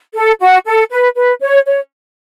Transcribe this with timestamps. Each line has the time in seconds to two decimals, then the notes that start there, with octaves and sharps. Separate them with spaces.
0.15 A4
0.39 F#4
0.65 A4
0.90 B4
1.15 B4
1.41 C#5
1.66 C#5